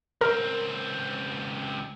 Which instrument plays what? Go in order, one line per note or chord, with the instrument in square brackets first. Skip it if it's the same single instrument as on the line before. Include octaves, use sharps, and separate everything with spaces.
[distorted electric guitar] C#2 C4 [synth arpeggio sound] A#4